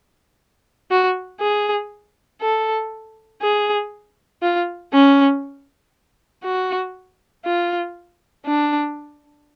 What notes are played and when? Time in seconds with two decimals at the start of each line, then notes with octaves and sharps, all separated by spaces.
0.91 F#4
1.41 G#4
2.41 A4
3.42 G#4
4.43 F4
4.93 C#4
6.44 F#4
7.45 F4
8.46 D4